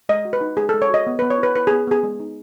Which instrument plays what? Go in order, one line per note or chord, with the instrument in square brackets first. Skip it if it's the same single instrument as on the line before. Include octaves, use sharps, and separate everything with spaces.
[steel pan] G#3 D#5
F#4
B4
D#4
G#3 G#4
A4
G#3
C#5
F#4 D#5
B3
B3 B4
C#5
E4 B4
E4 B4
B3 G#4
B3 G#4
G#3
D#4